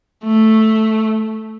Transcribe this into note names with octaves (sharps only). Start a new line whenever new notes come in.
A3